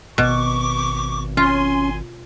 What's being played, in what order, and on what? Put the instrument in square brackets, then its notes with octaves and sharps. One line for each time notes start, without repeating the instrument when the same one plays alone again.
[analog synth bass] G#1 [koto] B2 [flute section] C#6 D6
[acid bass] C#4 [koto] F4 [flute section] G#5 C6